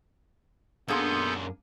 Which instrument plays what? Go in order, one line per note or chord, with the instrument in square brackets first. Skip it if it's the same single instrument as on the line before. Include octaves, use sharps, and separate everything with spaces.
[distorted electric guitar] F#2 C6 [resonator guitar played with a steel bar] A#3 D4 G#4 [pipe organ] B3 A4 G6